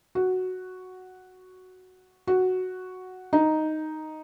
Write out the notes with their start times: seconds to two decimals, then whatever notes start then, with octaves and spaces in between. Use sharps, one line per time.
0.15 F#4
2.27 F#4
3.33 D#4